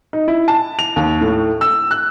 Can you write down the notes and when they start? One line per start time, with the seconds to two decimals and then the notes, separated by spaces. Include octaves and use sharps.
0.13 D#4
0.28 E4
0.48 A5
0.79 F7
0.96 D#2
1.21 A2
1.61 E6
1.91 F#6